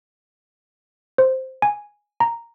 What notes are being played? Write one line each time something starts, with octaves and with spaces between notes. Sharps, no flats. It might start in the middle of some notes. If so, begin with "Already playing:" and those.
C5
G#5
A#5